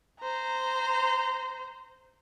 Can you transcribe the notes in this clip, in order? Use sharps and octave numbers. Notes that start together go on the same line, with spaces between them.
C5 A#5